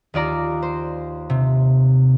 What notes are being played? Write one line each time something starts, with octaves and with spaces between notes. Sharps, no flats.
D#2 F4 D5 A#5
C5
C3